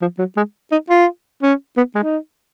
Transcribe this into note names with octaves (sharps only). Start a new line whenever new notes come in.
F3
F#3
G#3
D#4
F4
C#4
B3
G#3
D#4